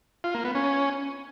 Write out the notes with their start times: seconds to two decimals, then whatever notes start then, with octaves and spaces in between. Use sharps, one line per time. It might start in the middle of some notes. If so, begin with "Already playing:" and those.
0.24 F4
0.34 A#3
0.44 B3
0.55 C#4